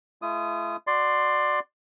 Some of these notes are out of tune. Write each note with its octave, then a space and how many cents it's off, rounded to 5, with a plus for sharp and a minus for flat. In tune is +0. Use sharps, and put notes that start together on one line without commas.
A3 -45 F4 -45 D#6 +0
F#4 +0 D5 +15 C6 +0